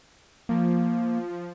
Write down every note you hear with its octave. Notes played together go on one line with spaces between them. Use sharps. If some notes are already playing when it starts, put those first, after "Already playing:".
F3 A#3